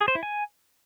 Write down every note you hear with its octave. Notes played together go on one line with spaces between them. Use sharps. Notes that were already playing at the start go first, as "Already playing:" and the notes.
G#4
C5
E4
G#5